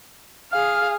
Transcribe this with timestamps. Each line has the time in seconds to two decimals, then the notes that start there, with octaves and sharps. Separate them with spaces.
0.52 G#4 F5 F6